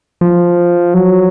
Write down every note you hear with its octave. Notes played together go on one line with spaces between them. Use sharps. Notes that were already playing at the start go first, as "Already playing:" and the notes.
F3
F#3